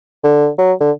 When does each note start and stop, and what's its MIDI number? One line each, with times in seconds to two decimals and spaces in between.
0.24 0.48 50
0.58 0.72 54
0.81 0.91 50